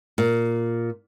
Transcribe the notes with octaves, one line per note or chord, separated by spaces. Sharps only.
A#2